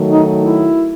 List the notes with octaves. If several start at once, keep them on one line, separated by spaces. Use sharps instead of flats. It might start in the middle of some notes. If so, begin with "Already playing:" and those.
Already playing: D#3 F#3 A3
D#4
E4